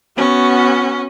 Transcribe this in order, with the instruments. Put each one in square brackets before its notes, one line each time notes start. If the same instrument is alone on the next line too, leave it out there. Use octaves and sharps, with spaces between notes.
[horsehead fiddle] B3 F#4 [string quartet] C#4